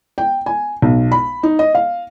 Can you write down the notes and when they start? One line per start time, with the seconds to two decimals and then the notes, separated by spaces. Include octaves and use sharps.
0.18 G5
0.46 G#5
0.82 B1
1.12 B5
1.43 D#4
1.59 D#5
1.75 F5